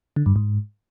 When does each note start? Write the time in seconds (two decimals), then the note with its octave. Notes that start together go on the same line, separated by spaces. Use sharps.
0.16 D3
0.26 G2
0.36 G#2